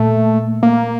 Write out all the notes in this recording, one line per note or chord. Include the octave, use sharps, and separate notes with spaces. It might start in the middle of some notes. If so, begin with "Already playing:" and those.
Already playing: A#2 A3
A#3